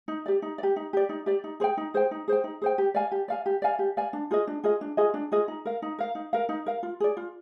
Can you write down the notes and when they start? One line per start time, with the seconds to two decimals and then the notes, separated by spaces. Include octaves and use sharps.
0.08 D#4
0.26 G4 D5
0.42 D#4
0.58 D5
0.63 G4
0.76 D#4
0.93 G4 D5
1.09 D#4
1.26 G4 D5
1.44 D#4
1.60 G#4 C5
1.64 G5
1.77 D#4
1.94 G#4 C5 G5
2.11 D#4
2.28 G#4 C5 G5
2.44 D#4
2.62 G#4 C5 G5
2.78 G4
2.94 D5 F5 G#5
3.12 G4
3.28 D5 F5 G#5
3.46 G4
3.62 D5 F5 G#5
3.79 G4
3.97 D5 F5 G#5
4.13 D4
4.31 F4 G#4 D#5
4.47 D4
4.64 F4 G#4 D#5
4.81 D4
4.97 F4 G#4 D#5
5.14 D4
5.32 F4 G#4 D#5
5.48 D#4
5.65 A#4 F5
5.82 D#4
5.98 A#4 F5
6.15 D#4
6.33 A#4 F5
6.49 D#4
6.66 A#4 F5
6.83 F4
7.00 G#4 D5
7.17 F4